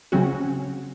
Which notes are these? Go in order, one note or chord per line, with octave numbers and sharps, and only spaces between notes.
C#3 F#3 C4 C#4 F#4